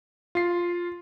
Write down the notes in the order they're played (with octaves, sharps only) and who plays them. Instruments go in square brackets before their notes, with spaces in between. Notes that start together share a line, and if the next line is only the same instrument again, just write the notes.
[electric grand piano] F4 C7